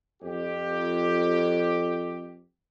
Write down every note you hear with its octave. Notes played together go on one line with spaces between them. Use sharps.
F2 G4